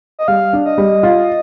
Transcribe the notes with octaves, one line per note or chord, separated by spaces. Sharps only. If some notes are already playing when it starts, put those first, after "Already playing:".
D#5
G3 F5
D4
D#5
G3
F4